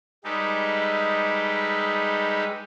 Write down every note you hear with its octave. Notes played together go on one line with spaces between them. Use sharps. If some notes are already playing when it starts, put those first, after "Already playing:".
G3 G#3 D#4 G4 A4 B4